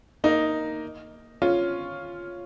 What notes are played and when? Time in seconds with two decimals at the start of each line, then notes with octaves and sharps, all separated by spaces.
0.24 A#3 D#4
1.42 C#4 F4